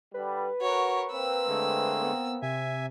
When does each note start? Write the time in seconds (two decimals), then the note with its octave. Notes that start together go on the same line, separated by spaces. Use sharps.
0.14 D3 G3 B4
0.62 F#4 A#4 C#5
1.12 A#3 C4 E6
1.47 D3 G#3 A3
2.02 B3
2.42 C3 E5 G#5